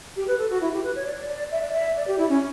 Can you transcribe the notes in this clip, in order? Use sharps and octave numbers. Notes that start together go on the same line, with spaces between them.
G4
B4
A4
F#4
E4
G4
B4
C#5
D5
D5
E5
D5
E5
D5
G4
E4
C#4